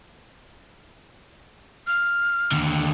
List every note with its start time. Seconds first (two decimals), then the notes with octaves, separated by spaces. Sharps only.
1.87 F6
2.52 D#2 D3